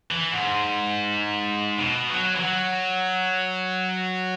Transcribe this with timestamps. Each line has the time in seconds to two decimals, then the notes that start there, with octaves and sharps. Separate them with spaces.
0.11 E3
0.31 G#2
1.78 B2
2.09 F#3
2.35 E3
2.40 F#3